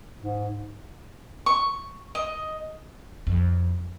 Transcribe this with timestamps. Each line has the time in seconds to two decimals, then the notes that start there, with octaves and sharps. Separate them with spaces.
0.22 G#2
1.46 C#6
2.15 D#5
3.27 F2